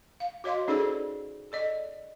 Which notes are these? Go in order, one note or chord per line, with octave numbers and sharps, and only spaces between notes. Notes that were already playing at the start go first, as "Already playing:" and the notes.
F5
F#4 C#5 D#5 F5 C6
C#4 D#4 G#4 A4 C5 D5
A4 D5 D#5